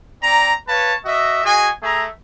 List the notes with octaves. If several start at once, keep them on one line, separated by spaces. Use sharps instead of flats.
C4 D5 A#5
B4 C#5 F5 A5
F#4 D#5 E5
F#4 G#4 D#5 G#5
A3 G#4 E5 A#5